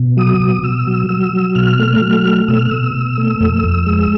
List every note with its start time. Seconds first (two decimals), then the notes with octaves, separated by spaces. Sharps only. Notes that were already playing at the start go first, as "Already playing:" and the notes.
Already playing: B2
0.17 F#3 D#6
0.40 B2
0.63 B2 E6
0.87 F#3
1.09 F#3 E6
1.33 F#3
1.55 B2 F6
1.79 A3
2.01 F#3
2.25 A3
2.48 B2 E6
2.59 F6
2.70 B2 E6
2.94 B2
3.18 A3
3.40 F2
3.64 F2
3.86 G#3